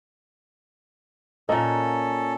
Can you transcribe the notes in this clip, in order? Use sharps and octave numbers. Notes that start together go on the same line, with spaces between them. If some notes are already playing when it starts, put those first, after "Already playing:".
A#2 A#3 C#4 A4 D#5